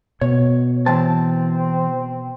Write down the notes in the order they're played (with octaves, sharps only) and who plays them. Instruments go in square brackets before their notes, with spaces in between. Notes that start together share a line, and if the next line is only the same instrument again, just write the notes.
[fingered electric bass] B2 [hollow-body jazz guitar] C#5
[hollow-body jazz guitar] E3 A5 [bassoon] C4